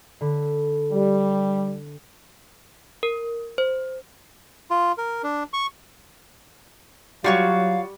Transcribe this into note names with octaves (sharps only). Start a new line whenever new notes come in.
D3 B5
G3
A#4
C5
F4
A#4
D4
C#6
F#3 G3 F4 F#4 C#5 F5